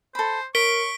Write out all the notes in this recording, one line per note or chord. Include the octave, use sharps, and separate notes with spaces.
A4 C5 B5
A#4 C#5 C#6 B6 D7 G7